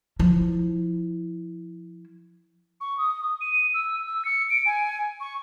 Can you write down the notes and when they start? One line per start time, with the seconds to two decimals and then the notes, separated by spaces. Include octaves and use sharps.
0.19 F3 E4
2.81 C#6
2.98 D#6
3.41 D#7
3.74 E6
4.06 E6
4.25 C#7
4.50 D7
4.66 G#5
5.20 C#6